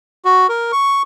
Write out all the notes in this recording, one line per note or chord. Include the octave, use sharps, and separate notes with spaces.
F#4
A#4
C#6